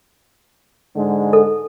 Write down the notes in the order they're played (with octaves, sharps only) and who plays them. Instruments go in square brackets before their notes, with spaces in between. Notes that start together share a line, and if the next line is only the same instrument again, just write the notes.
[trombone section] G#2 D3 G#3
[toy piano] A4